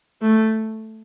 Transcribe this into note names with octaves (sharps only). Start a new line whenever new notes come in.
A3